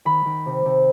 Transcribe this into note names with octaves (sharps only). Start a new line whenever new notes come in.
D#3 B5
D#3
C3
C3